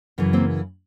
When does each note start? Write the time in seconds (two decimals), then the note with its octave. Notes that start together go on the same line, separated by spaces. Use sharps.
0.18 F#2 C#3 E3
0.33 A#3 C4